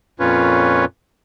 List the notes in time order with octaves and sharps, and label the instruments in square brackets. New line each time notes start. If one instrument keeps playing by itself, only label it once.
[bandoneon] F2 A#2 C#4 F4 B4 C#5